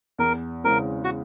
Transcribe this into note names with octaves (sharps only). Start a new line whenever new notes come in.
E2 A#4
C#3 E3 G#3 C4 A#4
F#4